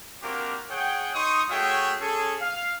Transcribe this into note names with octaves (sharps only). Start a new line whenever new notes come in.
A#3 C4 D4 F#4 G4 A#4
G#4 C#5 F#5 G5
D#4 C6 C#6 D#6
A3 F#4 G#4 C#5 E5 G5
C#4 G#4 A4
F5